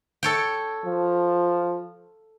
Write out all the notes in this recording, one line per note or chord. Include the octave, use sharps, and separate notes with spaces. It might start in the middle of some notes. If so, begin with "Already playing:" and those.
A4 C#5 G5
F3